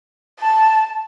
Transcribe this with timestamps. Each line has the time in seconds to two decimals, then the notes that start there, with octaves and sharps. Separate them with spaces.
0.39 A5